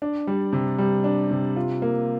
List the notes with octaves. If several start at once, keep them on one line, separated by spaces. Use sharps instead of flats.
D4
G3
C3
G3
D4
C3
F4
A#3